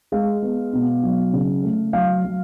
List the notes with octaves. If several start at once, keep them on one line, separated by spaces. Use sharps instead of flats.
G#3 F5
B3
B2
F#3
C#3
A3
F#3 F5
F#3